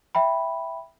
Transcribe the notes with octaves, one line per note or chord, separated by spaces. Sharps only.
E5 G5 B5